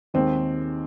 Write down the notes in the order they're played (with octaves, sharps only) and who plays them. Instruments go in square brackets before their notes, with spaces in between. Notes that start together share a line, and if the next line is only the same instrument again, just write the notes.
[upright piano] D#2 D#3 G#3 C4